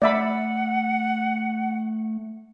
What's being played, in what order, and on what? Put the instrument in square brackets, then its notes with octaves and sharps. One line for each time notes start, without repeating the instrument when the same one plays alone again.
[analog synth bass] A3 [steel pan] D5 E5 B5 [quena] F#5